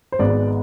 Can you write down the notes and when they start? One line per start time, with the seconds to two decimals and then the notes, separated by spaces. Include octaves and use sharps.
0.12 C5
0.19 G#1 G#2 G#3 B3 D5